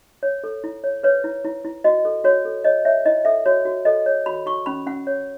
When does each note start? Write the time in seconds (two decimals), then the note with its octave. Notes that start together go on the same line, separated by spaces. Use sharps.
0.23 C#5
0.44 A4
0.64 E4
0.84 C#5
1.03 B4 C#5
1.24 E4
1.44 E4
1.64 E4
1.84 F#4 D#5
2.05 A4
2.24 F#4 C#5
2.45 A4
2.64 C#5 D#5
2.85 C#5 E5
3.06 E4 D#5
3.25 A4 E5
3.46 F#4 C#5
3.65 F#4
3.85 A4 D#5
4.06 C#5
4.26 F#4 B5
4.46 F#4 C#6
4.66 C#4 B5
4.86 C#4 F#5
5.07 C#5